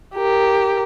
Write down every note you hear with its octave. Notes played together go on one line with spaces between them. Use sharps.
G4 A#4